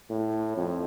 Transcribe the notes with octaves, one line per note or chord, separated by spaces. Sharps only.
A2
F2